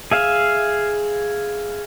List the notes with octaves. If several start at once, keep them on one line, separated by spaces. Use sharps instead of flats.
G#4 E5 F5